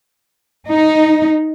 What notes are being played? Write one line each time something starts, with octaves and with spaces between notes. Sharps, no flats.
D#4